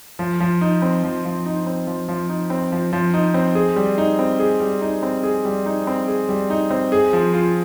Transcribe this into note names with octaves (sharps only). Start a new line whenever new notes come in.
F3
F3
D#4
C4
F3
F3
D#4
C4
F3
F3
D#4
C4
F3
F3
D#4
C4
G#4
G3
D#4
C4
G#4
G3
D#4
C4
G#4
G3
D#4
C4
G#4
G3
D#4
C4
G#4
F3
F4